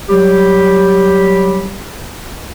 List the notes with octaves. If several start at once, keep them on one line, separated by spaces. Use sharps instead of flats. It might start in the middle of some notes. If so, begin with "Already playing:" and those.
F#3 G3 G4